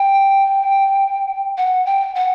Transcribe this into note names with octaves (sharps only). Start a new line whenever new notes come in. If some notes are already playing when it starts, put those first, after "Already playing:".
Already playing: G5
F#5
G5
F#5